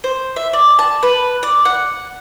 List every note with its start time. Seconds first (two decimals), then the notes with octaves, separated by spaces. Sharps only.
0.04 C5
0.36 E5
0.53 D5
0.79 A5
1.03 B4
1.43 D5
1.65 F#5